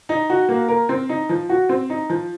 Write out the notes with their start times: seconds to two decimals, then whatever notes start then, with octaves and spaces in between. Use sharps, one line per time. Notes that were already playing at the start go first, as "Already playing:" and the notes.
0.09 D#4
0.30 F#4
0.49 A#3
0.69 A#4
0.89 C4
1.09 D#4
1.29 F3
1.49 F#4
1.69 C4
1.90 D#4
2.10 F3